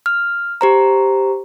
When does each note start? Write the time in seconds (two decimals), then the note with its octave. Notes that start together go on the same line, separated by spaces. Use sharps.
0.06 F6
0.61 G4 C5 A#5